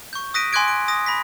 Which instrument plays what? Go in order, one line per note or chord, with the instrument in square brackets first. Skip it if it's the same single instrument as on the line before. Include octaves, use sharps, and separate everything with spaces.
[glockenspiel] C#6 G6
D#6 F#6 A#6 B6 D7 D#7
G#5 C6 D6 F#6 G#6 D7
F#6 D7
G#5 D#6 A#6
B5 A#6 B6